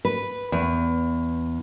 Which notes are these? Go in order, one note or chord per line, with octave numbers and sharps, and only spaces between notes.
B4
E2